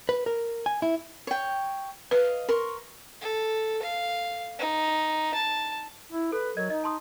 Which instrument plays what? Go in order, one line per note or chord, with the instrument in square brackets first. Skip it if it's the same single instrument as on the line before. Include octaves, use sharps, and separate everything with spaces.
[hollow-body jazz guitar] B4
A#4
G#5
E4
[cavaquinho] C#5 G5
[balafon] B4 [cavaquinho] D#5 F5
[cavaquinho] A#4 C6 C#6
[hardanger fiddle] A4
F5
D#4
A5
[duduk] E4
[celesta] A4 [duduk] B4
[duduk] F#3 [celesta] A#4 D#5 G#6
[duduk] D#4 [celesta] D#5
[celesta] A5 C6 D#6